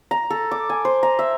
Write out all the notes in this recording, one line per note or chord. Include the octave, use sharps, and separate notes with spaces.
A#5
A4
D6
G#5
C5
A#5
E5